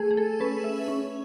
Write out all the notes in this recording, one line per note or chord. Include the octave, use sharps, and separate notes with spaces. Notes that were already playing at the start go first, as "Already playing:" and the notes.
Already playing: A3 G#4
G#4
A4
C#4 B4
E5
C#4